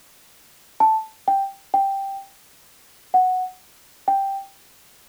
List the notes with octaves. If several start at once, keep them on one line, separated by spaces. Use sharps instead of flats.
A5
G5
G5
F#5
G5